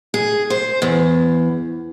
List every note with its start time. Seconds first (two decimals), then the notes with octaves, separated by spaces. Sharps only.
0.14 G#4
0.50 C5
0.82 E2